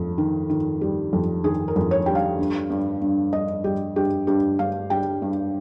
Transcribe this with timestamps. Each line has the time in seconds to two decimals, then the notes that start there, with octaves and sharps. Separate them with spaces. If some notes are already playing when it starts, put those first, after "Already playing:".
Already playing: F2
0.18 D#3
0.50 D#3
0.81 G3
1.13 F2
1.44 D#3 G#4
1.68 A#4
1.76 F2
1.91 C#5
2.06 G3 G5
2.15 F5
2.39 G2
2.70 G2
3.02 G2
3.33 G2 D#5
3.64 G3 G4
3.96 G2 G4
4.27 G2 G4
4.59 G2 F5
4.90 G3 G5
5.22 G2